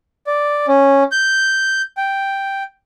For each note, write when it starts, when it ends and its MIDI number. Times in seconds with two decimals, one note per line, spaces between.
0.27 0.66 74
0.68 1.03 61
1.12 1.82 91
1.97 2.63 79